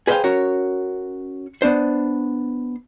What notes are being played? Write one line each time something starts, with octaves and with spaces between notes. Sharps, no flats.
G#4 B4 C5 D#5 F5 G5
C#4 F#4 A#4 C#5
B3 D4 C5